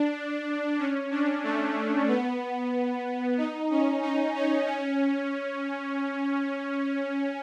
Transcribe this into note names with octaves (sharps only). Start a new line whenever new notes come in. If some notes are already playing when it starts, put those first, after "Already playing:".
Already playing: D4
C#4
D4
A3
B3
D#4
C#4
D#4
C#4
C#4